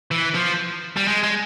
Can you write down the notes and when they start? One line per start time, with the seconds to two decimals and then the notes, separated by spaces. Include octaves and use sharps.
0.11 E3
0.35 F3
0.97 G3
1.08 G#3
1.23 G#3